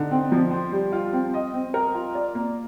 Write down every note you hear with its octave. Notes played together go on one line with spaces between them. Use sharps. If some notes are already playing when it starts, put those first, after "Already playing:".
Already playing: D3 D#4
C4
F3
C5
G3
F4
C4
D#5
C4
A#4
F4
D5
A#3